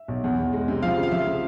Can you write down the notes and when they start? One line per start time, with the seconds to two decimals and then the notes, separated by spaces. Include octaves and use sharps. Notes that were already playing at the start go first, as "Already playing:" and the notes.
Already playing: E5
0.08 B1
0.24 E2
0.38 E2
0.53 G#3
0.68 C3
0.82 F3 F4 F5
0.97 C#3
1.03 F5
1.11 F3 E5
1.27 C#3